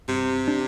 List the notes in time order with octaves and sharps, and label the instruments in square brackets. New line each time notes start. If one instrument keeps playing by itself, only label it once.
[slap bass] G2 [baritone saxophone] C3
[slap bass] D4